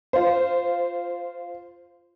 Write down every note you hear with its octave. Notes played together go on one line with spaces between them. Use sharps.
F4 C5